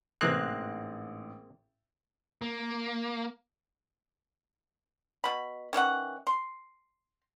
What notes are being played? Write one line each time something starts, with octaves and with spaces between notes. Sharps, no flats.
A1 G#2 C3 E3 G#3 A#3 C4 F#6
A#3
B2 B5
D#3 E3 C#4 F#5
C6